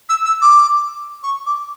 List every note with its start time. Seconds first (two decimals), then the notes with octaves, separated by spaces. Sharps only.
0.09 E6
0.25 E6
0.42 D6
1.23 C#6
1.46 D6